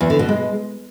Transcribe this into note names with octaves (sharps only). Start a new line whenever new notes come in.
E2
D3
B2
G#3